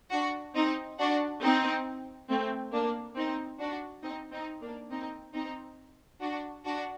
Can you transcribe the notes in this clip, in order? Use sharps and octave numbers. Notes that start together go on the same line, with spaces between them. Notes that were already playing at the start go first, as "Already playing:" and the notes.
D4 F#4
C4 D#4
D4 F#4
C4 D#4
A3 C4
A#3 D4
C4 D#4
D4 F#4
C4 D#4
C4 D#4
A#3 D4
C4 D#4
C4 D#4
D4 F#4
D4 F#4